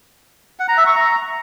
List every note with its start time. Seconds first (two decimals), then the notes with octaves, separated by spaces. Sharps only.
0.60 F#5
0.68 A#5
0.77 E5
0.86 C#6
0.95 A#5